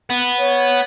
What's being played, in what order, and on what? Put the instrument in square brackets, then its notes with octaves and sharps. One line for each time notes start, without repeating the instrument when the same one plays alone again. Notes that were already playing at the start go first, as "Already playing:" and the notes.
[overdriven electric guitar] B3
[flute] C#5